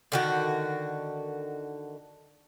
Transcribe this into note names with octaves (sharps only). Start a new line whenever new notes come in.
D3 D#3 F#4